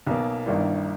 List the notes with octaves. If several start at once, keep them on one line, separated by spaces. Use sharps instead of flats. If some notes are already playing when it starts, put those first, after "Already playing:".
B1 B2 A#3
G1 G2 D#3 A#3 E4